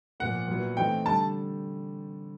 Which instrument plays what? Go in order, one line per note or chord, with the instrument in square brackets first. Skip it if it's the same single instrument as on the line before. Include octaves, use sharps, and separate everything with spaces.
[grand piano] A#2 F3 A#3 [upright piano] F#5
[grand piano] A#2 F#3 B3 E4
[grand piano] E3 A3 C4 D#4 [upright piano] G5
[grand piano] D3 G3 [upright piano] A5